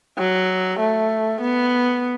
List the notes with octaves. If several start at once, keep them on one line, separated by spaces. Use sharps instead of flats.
F#3
A3
B3